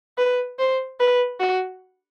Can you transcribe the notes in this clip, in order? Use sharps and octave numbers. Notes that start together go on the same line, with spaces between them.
B4
C5
B4
F#4